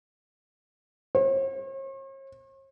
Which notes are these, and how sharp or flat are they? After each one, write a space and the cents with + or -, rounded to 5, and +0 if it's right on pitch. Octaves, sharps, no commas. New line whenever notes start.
C#5 -45